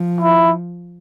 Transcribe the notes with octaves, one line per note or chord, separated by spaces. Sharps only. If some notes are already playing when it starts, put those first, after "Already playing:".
Already playing: F3
E4